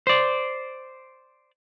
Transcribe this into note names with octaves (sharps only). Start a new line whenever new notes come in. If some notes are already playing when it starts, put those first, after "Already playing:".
C5 D5